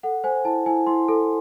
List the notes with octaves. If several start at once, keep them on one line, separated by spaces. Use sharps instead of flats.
A4 F#5
C5 G#5
E4 A5
E4 G#5
E4 C6
A4